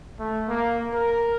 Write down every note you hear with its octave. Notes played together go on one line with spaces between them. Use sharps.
A3
A#3
A#4